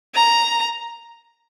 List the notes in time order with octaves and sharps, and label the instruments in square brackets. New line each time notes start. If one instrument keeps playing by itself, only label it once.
[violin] A#5